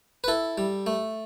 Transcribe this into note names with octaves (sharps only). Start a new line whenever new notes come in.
B4
E4 A4
G3
A3